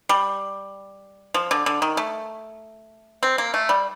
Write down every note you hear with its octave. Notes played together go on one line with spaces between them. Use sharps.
G3
F3
D3
D3
D#3
A3
C4
A#3
A3
G3